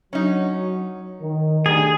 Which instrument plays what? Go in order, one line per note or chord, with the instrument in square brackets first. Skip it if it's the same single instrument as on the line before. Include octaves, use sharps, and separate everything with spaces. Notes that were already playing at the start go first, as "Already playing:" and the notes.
[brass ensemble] F#3 [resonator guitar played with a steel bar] C#4 D#4
[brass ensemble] D#3
[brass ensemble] D2 G3 [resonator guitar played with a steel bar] D#3 [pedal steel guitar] G#4